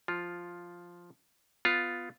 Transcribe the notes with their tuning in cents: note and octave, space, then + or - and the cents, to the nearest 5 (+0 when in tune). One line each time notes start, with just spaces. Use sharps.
F3 +0 F4 +0
B3 +15 F4 +5